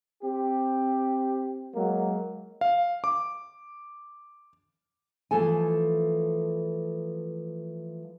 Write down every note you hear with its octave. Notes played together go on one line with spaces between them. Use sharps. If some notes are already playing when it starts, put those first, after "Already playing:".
C4 G4
F#3 G#3 A#3 A#4
F5
D6
E3 F3 A3 A4 G#5